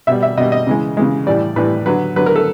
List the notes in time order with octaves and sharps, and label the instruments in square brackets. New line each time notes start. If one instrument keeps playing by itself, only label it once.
[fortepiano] B2 G3 E5
E5
B2 G3 D#5
D#5
C#3 E3 G#3
C#3 E3 G#3
A2 E3 G3 D5
A2 E3 G3 B4
D3 F#3 B4
D3 F#3 B4
A#4
A4